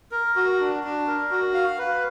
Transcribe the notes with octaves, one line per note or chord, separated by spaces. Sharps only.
A#4
F#4
D4
D4
A#4
F#4
F5
B4